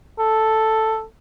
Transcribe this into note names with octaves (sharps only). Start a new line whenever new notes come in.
A4